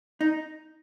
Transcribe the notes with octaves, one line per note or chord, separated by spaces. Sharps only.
D#4